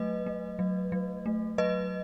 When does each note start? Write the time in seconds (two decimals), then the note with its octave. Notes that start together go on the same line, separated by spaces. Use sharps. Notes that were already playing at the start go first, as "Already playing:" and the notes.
Already playing: F#3 A3 B4 D#5
0.26 A3
0.59 F#3
0.92 F#3
1.26 A3
1.58 F#3 B4 D#5